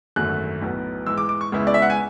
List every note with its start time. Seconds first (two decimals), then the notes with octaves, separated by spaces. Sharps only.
0.16 G#1 F#2 D3 A3 F#6
0.62 B1 A2 F#3 B3
1.06 G#2 E3 G#3 E6
1.18 D6
1.29 D6
1.41 C#6
1.52 C#2 C#3 G#3 B3 E4
1.67 D5
1.74 E5
1.82 F#5
1.90 G#5